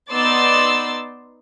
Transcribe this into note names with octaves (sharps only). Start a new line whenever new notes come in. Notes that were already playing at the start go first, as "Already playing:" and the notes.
B3 D#4 D5 C6 E6 A6